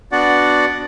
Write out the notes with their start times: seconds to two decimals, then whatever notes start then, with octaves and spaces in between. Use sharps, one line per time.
0.12 B3 D4 F#4 D5 F#5